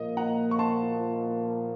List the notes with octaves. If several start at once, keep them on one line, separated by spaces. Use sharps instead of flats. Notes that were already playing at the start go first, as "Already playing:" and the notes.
Already playing: A#2 F3 A#3 D#5
F#5 A#5
C#6
A5 C6